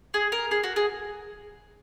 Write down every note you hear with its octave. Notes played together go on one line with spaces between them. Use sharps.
G#4
A#4
G#4
F#4
G#4